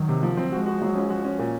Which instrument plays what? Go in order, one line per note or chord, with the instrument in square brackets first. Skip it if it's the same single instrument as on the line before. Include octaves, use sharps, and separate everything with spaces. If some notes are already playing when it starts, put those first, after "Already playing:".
Already playing: [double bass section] D#3 F#3
[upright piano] C3
F3
C4
[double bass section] F3 G#3 [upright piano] F#4
[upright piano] F#4
F#3
C#4
F#4
C#4
A#2